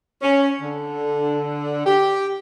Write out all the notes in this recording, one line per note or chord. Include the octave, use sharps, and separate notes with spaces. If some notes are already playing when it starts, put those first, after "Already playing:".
C#4
D3
G4